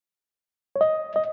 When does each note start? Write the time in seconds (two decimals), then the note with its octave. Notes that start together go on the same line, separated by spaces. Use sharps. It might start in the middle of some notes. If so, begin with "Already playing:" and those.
0.76 C#5
0.81 D#5
1.16 D#5